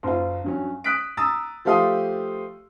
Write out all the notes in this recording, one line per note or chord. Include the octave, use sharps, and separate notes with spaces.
F#1 F4
G2 F#3 C#4
D#6 F#6 B6 D7
A#5 D#6 E6 A6
F3 A3 G4 F5 C6 D#6